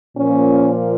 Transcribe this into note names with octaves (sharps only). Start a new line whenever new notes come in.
A#2 F3 A#3 C#4